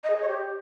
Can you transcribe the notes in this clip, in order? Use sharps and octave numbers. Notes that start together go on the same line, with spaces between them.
D#5
G#4
D#5
C#5
G4